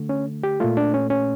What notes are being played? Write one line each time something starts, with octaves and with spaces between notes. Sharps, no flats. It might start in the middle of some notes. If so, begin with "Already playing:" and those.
Already playing: D3 A3
C#4
G4
A#2 A3 F4
D4
C#4
C#4